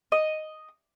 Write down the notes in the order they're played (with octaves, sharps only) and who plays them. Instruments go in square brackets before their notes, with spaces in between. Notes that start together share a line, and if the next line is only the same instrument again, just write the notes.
[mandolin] D#5